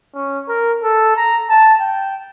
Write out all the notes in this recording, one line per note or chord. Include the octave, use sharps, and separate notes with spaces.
C#4
A#4
A4
A#5
A5
G5